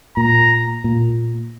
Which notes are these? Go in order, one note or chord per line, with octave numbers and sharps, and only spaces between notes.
A#2 A#5
A#2